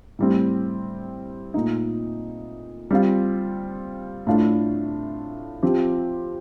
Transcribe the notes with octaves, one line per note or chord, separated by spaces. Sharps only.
A2 G3 C4
A#2 A3 D#4
G3 C4 F4
A2 A3 D4 F4
F3 C4 G4